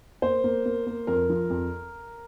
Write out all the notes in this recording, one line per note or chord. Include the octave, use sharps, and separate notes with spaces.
A#3 C5
A#3
A#3
A#3
F2 A#4
F3
F2